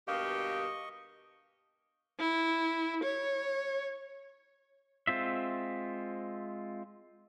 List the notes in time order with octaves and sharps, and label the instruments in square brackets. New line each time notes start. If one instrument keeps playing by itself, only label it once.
[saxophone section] G2 B2 A#3 [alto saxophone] G4 [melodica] D#5 C#6 [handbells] F5
[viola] E4
C#5
[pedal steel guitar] G#3 C4 F4 E5